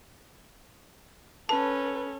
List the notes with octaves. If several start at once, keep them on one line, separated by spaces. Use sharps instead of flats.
C#4 A4 B4 A5